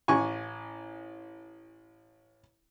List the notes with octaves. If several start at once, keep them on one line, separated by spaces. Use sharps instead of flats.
A1 G#5 C#6